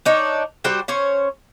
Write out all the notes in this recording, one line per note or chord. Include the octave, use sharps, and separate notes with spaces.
D4 D#4 C#5
G3 F#4 C5 G5
C#4 C5 C#5